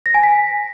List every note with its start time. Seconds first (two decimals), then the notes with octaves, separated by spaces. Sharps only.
0.06 A#6
0.14 G#5
0.23 B6